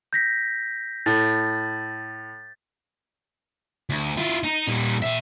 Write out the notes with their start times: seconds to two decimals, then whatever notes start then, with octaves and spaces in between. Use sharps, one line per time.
0.13 G6 A#6 B6
1.06 A2 A6
3.90 D2
4.18 E4 F4
4.44 D#4
4.68 A#2 G3
5.02 A#2 E5